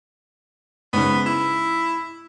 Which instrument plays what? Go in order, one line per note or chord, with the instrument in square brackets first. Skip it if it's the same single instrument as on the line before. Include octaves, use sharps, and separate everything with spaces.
[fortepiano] G#2 C#3 [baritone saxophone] B3
[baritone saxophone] E4